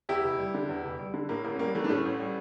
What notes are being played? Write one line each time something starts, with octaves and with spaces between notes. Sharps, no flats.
E2 E4 G4
F1
G3
D3
E2
F1
G3
D3
A2 A#3
A1 A#3
C#4
G3 A#3
E3 A3
D4
A2 A3 C#4
A1
G3